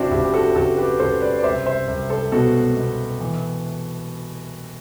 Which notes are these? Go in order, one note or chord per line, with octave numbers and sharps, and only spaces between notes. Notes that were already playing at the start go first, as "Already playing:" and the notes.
Already playing: F#1 C4 D4 E4 F#4
F#1 E4 G4
G4
F#4 A4
F#1 F#4 A4
G4 B4
F#1 A4 C5
B4 D5
D5
C2 C5 E5
C5 E5
C2
A4 C5
B2 F#4 A4
B2
E3